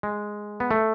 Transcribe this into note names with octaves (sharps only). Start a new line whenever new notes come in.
G#3
B3
A3